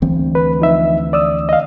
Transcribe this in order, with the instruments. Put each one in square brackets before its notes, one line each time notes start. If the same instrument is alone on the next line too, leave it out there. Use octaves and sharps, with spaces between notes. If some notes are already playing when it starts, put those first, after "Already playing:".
[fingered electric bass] D2 E3 C4
[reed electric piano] B4
F3 D#4 E5
D5 D#6 E6
D#5 F5